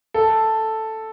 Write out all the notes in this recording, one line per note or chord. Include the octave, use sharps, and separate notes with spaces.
A4